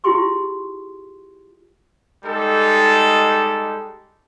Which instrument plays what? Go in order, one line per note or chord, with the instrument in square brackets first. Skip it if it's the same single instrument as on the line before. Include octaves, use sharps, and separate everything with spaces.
[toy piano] E4 F4 G4 G#4 C6 C#6
[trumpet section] G3 G#3 D#4 G4 A4